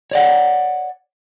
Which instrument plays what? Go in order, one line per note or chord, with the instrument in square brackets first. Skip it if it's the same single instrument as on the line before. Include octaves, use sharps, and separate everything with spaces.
[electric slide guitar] C#5 D5 F#5